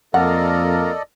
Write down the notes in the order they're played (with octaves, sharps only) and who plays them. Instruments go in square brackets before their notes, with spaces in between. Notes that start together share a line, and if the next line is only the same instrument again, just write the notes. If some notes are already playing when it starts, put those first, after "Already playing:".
[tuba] F2 [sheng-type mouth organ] A#3 F4 A#4 [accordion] A4 D5 D#5 [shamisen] F#5